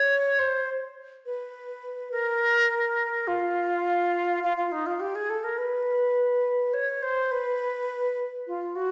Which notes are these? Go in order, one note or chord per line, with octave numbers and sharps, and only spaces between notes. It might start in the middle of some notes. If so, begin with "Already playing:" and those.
Already playing: C#5
C5
B4
A#4
F4
F4
F4
D#4
F4
G4
G#4
A4
A#4
B4
C#5
C5
B4
F4
F#4